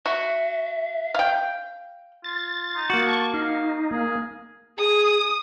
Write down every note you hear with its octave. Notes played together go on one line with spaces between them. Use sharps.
F#4 E5
F5 G5
F4 A6
D#4
A#3 F#4
A5 C#6
D#4 F5
A#3 G#4
G#4 D#6